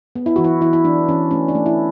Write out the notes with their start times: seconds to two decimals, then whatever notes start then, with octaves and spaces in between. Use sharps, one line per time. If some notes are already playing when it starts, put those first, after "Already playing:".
0.15 B3
0.26 E4
0.36 E3 F#4
0.44 E4
0.61 E3 E4
0.73 E4
0.84 E3 D4
1.09 E3 C#4
1.31 A3 C#4
1.48 D4
1.55 A3
1.66 E4